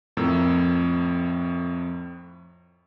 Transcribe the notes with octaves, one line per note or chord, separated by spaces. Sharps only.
F2 A2 A#4 E6